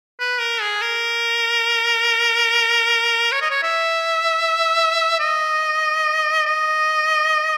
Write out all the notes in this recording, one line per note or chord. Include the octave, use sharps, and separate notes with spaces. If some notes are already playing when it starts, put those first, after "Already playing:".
B4
A#4
G#4
A#4
C#5
D#5
C#5
E5
D#5
D#5